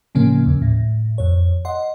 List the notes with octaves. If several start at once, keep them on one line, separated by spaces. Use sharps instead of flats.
A2 C#3 F3 A#3 C#4
D#2
A2
F2 C#5
D#5 F#5 C6